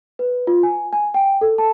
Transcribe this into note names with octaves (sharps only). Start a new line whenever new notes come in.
B4
F4
G#5
G#5
G5
A4
A5